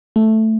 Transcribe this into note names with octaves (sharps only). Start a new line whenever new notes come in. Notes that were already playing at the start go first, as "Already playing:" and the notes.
A3